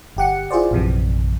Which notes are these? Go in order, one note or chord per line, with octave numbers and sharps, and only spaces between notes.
G1 G4 F#5 C#7
E4 F4 G#4 C5 D5
A#1 F#2 C3 E3